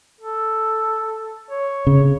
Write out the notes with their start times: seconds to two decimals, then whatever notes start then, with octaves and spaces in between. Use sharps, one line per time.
0.21 A4
1.51 C#5
1.87 C#3